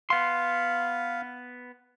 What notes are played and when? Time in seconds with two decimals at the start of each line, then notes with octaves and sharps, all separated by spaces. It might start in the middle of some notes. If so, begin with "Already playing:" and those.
0.10 B3 F5 C6